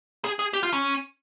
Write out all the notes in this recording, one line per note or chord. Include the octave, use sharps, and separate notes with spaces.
G#4
G#4
G4
F4
C#4